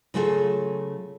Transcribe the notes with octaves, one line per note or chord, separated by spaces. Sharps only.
C#3 F#3 A3 F4 G#4 A4